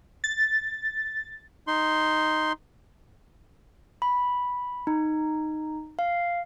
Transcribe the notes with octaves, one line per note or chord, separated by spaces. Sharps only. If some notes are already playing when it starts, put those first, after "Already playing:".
A6
D#4 C6
B5
D#4
F5